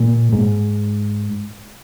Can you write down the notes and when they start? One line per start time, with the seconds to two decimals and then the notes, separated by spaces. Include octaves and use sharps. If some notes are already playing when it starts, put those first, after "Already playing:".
Already playing: A#2
0.32 G#2